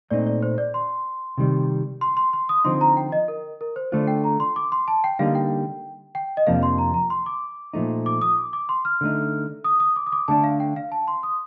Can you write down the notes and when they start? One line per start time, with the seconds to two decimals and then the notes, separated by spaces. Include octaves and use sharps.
0.11 A#2 A3 C4 D#4 D5
0.27 D5
0.43 C5
0.58 D5
0.74 C6
1.38 C3 D#3 G3
2.01 C6
2.17 C6
2.33 C6
2.49 D#6
2.65 D3 F3 C4 D#4 C6
2.81 A#5
2.97 G5
3.12 D#5
3.28 A#4
3.61 A#4
3.76 C5
3.92 D3 A3 D4 F4 C5
4.08 G5
4.24 A#5
4.40 C6
4.56 D6
4.72 C6
4.88 A5
5.04 G5
5.19 D3 G3 A#3 D#4 F5
5.35 G5
6.15 G5
6.37 D#5
6.47 F2 C3 F3 A#3 D4 F5
6.63 C6
6.78 A#5
6.94 A#5
7.10 C6
7.26 D6
7.74 A#2 F3 A3 D#4
8.06 D6
8.21 D#6
8.37 D6
8.53 D6
8.69 C6
8.85 F6
9.01 D3 A3 D#4
9.64 D#6
9.80 D#6
9.96 D6
10.06 D#6
10.12 D6
10.28 D3 A3 D4 A5
10.44 F5
10.60 G5
10.76 F5
10.92 A5
11.08 C6
11.23 D#6